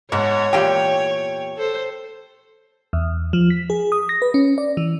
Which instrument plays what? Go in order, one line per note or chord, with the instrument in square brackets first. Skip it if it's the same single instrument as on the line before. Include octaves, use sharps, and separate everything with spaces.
[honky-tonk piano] G#2 [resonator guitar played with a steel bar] B2 [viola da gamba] C#5
[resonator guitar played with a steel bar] E2 A#2 G4 [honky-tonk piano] G5
[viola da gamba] A4 C5
[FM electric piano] E2
F3
B6
G#4
D#6
A#6
B4
C#4
D5
E3